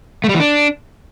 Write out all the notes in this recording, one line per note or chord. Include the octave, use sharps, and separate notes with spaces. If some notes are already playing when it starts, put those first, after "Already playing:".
A3
G3
E3
D4